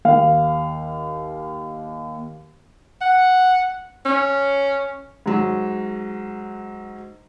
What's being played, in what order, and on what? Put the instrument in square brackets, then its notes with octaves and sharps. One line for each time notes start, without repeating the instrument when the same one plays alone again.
[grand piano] D#2 F5
[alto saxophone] F#5
C#4
[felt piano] G#2 F#3